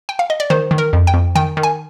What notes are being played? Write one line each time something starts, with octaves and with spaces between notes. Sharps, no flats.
G5
F5
D#5
D5
D#3 C5
D#3
A#4
F2
G5
F2
D#3 G5
D#3
G#5